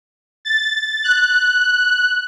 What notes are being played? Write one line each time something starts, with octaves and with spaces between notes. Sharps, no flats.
A6
F#6